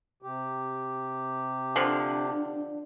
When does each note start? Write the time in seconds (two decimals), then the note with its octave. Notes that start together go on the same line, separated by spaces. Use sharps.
0.22 C3 G4
1.76 D3 F3 D4